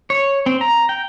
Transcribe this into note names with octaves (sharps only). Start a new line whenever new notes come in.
C#5
C4
A#5
G5